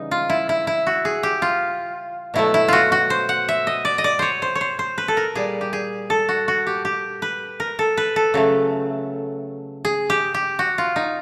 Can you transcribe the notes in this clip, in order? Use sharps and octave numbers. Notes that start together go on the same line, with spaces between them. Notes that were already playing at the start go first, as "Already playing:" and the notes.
Already playing: C#3 E3 G3 D#4
F4
E4
E4
E4
F#4
G#4
G4
F4
B2 F#3 A3 E4
E4
F4 F#4
F#4
C5
F#5
E5
D#5
D5
D#5
D5
C5 C#5
C5
C#5
C5
C5
B4
A4
A#4
A#2 G3 G#4
G4
G#4
A4
F#4
F#4
G4
G4
B4
A#4
A4
B4
A4
C#3 F#3 A3
G#4
G4
G4
F#4
F4
D#4